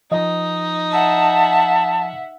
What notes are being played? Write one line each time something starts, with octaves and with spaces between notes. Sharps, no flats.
F3 D#4 D#5
E5 F#5 A5